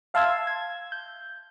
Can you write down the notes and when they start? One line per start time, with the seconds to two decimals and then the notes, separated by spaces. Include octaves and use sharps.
0.14 E5 F5 A5 C6 E6 G#6
0.47 G#6
0.92 G6